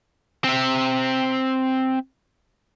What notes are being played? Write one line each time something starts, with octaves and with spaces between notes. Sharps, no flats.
C4 E5